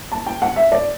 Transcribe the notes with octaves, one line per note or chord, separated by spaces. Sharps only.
A5
G5
F#5
E5
D5